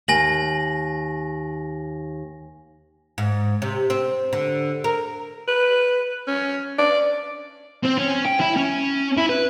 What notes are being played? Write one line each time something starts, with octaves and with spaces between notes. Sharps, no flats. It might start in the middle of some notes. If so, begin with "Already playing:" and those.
D#2 G#5 A#6 F#7
G#2
C3
C4
D3
A#4
B4
C#4
D5
C4
C#4
G5
E4
C#4
E4
B4